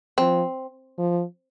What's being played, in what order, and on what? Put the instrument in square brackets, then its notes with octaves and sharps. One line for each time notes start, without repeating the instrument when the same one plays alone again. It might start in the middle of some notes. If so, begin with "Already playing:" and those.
[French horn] F3 [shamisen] C4
[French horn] F3